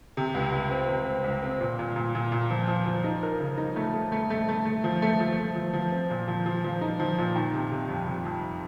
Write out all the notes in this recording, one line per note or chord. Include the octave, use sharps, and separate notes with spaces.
C3
C#2
C#2
C4
C3
C4
C#2
C4
A#2
A#2
A#2
A#2
A#2
F3
F3
F3
D#4
A#4
C#3
D#4
A3
A3
A3
A3
A3
A3
F3
A3
F3
A3
F3
F3
C4
A#2
F3
F3
F3
D#4
F3
A#2
D#3
C3
C3
F2
C3
F2